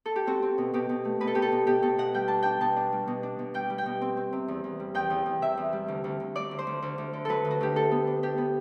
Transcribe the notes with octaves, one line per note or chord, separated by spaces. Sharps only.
A4
G4
C4 F#4
C4
B2
B2 G4
B2
A3
B2 B4
A4
B2 G4
A4
B2
B2 G4
B2 A4
B2 F#5
G3 G5
D4 A5
D4 G5
B2 A5
D4
G3
B2
D4
B2
G3 G5
G3
G5
B2
C4
C4
C3
E2
E2
G3
E2 G5
E2
E2
C3 E5
E2
G3
D2
D2
D2
F#3 D5
D2
C5
D2
D2
D2
D3
F#3 A4 B4
D2
F#4
D2 G4
D4 A4
B3
D4
D4 G4
B3